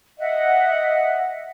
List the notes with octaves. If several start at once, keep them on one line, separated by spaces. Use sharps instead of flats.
D#5 E5 F#5